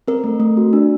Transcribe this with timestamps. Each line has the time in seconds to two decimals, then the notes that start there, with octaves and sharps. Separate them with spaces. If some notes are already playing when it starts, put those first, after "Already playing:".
0.08 C4 A#4
0.24 A3
0.40 A3
0.57 F#4
0.73 D4